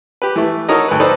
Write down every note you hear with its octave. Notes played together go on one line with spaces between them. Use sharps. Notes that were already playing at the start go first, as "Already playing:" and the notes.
G4 B4
E3 A3
D#4 F#4 A4 A#4 C#5 D#5
D2 B4
D#4 A4 B4 C5 D5